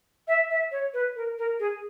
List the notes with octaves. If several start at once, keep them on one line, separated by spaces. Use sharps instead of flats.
E5
E5
C#5
B4
A#4
A#4
G#4